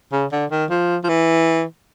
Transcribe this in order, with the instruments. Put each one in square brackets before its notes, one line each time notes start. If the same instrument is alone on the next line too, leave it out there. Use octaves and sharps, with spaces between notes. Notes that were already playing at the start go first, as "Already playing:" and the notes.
[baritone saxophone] C#3
D3
D#3
F3
F3
E3